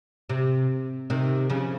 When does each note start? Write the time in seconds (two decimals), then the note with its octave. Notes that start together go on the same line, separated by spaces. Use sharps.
0.30 C3
1.10 C3 D#3
1.50 C#3 F3